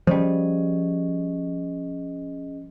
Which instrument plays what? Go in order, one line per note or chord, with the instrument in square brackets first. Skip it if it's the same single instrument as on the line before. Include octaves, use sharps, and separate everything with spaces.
[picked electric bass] F3 G3 [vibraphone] C#4 G#4 D#5